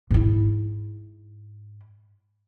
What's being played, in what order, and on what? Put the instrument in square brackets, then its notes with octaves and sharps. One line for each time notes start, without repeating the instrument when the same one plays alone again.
[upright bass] G#2 E4